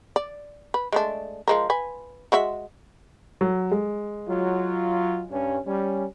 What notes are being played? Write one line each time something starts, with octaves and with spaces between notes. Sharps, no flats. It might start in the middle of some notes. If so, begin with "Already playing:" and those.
D5
B4
G#3 A3 D4
F3 G#3 A#4
B4 G#5
G#3 F#4 E5
F#3
G#3
F#3 F4
G2 C#4
G3 C#4